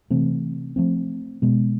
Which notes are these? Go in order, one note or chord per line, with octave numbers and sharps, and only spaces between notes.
C3 E3 A3 C4
F3 A3 C4
B2 G#3 B3